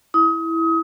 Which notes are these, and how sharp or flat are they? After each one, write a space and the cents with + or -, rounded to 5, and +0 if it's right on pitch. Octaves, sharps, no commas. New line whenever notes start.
E4 -5 D#6 +30